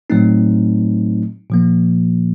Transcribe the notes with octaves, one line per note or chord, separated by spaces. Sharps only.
A2 F#3 A3 C4 D#4
A#2 F3 A#3